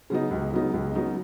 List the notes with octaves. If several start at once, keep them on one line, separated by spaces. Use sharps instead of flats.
C#3 F#3 B3 D#4
C#2
C#3 F#3 B3 D#4
C#2
C#3 F#3 B3 D#4